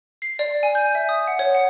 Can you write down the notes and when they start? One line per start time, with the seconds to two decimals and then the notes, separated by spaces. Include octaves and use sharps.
0.22 C7
0.39 D5
0.63 G#5
0.75 G6
0.95 E5
1.09 D#6
1.28 F#5
1.39 C#5
1.55 F#5